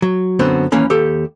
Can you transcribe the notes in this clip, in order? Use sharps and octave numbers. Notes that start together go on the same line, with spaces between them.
F#3
F#2 D3 B3 C4 F#4
D#2 E3 A#3 C#4 B5
D#2 G4 A4